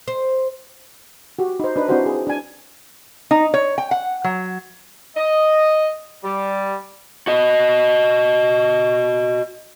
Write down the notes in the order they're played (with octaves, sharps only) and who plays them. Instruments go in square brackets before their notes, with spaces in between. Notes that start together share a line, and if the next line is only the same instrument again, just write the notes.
[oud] C5
[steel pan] F#4 G4
D#4 C5
D4 D#4 B4
C4 D4 E4 F#4 G4 C5
G#4
D4 G#5
[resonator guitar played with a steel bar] D#4
C#5
G5
F#5
F#3
[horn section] D#5
G3
[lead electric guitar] F#4 D#5